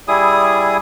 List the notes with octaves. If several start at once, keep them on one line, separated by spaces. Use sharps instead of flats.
G3 E4 G#4 D#6